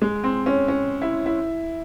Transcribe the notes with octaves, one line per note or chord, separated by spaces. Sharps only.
G#3
C4
C#4
C#4
E4
E4